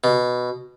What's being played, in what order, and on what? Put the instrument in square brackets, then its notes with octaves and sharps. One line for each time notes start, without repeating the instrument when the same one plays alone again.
[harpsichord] B2